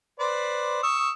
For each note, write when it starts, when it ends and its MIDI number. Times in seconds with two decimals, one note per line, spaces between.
0.20 0.80 71
0.20 0.80 72
0.20 0.80 74
0.83 1.11 85
0.83 1.11 87
0.83 1.11 88